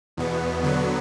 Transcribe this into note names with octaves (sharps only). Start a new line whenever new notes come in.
E2 B2 B3
D3 F#3 B3